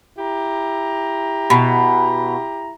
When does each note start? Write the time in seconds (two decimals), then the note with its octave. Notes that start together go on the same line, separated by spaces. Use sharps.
0.18 E4 G4 A#5
1.50 B2